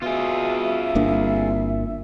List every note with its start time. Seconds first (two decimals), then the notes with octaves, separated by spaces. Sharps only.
0.02 B2 F4 G#4 E5
0.95 G1 C2 A#3 D4